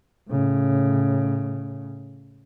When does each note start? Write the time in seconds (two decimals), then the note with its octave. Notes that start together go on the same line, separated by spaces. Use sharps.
0.29 A2 C#3